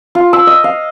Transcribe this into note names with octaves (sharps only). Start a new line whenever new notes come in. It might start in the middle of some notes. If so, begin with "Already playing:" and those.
F4
E6
D#5
F5